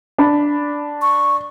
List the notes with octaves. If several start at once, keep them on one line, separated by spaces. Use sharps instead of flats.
D4 B5
C#6